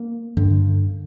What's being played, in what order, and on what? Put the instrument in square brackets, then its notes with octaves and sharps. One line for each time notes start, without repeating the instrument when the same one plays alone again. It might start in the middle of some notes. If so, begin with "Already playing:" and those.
Already playing: [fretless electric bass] A#3
G2 D3